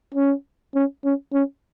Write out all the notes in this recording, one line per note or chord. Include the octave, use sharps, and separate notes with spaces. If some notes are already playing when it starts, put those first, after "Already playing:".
C#4
C#4
C#4
C#4